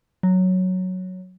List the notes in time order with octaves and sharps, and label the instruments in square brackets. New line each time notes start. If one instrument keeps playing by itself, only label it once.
[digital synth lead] F#3